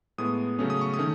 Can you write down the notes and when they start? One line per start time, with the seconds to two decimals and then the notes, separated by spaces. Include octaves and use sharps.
0.18 A2 G#3 B3 D#6
0.59 C#3 F#3 A3 C#4
0.70 D#6
0.81 C#6
0.94 D#6
0.99 D#3 A3 C#4